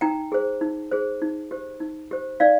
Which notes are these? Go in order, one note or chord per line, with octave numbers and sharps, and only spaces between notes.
D#4 G5 A#5
G#4 C5
D#4
G#4 C5
D#4
G4 C5
D#4
G4 C5
D#4 D5 F5